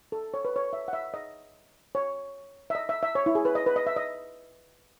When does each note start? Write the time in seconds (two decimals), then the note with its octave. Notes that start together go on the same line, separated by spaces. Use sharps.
0.12 A4
0.34 C#5
0.45 B4
0.56 C#5
0.73 E5
0.88 F#5
0.93 E5
1.14 D#5
1.95 C#5
2.70 E5
2.75 D#5
2.89 E5
3.03 E5
3.15 C#5
3.26 E4
3.35 G#4
3.45 B4
3.55 D#5
3.66 B4
3.76 D#5
3.87 E5
3.96 D#5